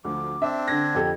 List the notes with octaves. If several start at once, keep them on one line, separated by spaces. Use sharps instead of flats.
D2 F3 D6
C4 D4 E5
D3 G#6 A#6
F2 G4 A4